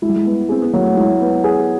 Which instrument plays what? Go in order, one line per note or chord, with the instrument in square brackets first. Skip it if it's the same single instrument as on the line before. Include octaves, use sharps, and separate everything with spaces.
[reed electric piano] G#3 [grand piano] E4
[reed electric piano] G3
G#3
[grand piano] B3
[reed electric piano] C4 [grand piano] G#4
[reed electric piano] B3
[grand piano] F#3 [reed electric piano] A#3
[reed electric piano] A3
[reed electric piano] G#3 [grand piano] E4
[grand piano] B3
G#4